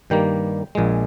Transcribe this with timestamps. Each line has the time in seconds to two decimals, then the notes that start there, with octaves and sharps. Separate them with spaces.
0.10 G2 D#3 G3 A#3 G5
0.75 A#1 A#2 G#3